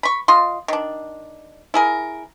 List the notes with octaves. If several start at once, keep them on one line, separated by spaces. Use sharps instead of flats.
B5 C#6
F4 D#5 C6
D#3 D4
E4 G#4 A#4